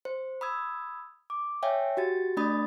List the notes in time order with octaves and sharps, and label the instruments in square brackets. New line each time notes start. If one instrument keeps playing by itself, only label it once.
[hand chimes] C5
B5 D#6 E6 G#6
D6
C#5 E5 F5 G5 G#5
F#4 G4 A6
A3 D4 D5 B5 D#6 A6